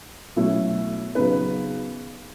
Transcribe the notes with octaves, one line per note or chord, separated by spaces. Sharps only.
B2 F#3 A3 C#4 E4
C#3 F#3 B3 D#4 B4